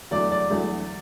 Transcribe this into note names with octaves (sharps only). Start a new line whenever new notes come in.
E2 D3 F#3 A3 D5
D5
E2 D3 F#3 A3